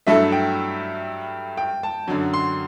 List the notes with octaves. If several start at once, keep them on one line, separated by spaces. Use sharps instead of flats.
G2 F#3 A3 E4 A4 E5
G5
G5
A5
F#2 D3 F#3
C6